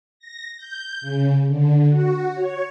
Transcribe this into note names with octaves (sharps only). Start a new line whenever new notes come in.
A#6
G6
C#3
D3
F#4
C#5